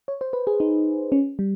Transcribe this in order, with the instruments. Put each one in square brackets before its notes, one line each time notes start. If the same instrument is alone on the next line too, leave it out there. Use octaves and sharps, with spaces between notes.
[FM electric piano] C#5
C5
B4
G#4
D#4
C#4
G3